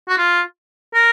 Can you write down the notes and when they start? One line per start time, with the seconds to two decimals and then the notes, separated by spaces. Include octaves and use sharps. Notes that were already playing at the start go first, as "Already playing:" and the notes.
0.08 F#4
0.18 F4
0.94 A#4